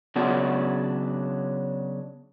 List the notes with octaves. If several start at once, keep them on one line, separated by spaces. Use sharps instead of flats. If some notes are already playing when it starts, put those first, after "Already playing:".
C#3 F#3 B3 D4 F#5